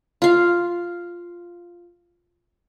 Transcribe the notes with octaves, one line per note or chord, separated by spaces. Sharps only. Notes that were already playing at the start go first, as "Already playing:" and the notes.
F4 F5